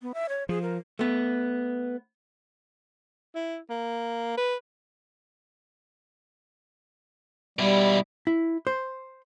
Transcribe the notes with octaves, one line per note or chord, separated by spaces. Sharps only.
B3
E5
C#5
F3 G#4
A#4
A3 B3
E4
A#3
B4
B2 G3 E4
E4
C5